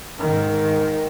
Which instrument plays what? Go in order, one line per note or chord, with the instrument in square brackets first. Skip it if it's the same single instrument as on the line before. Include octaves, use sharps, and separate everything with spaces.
[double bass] G#2 D#3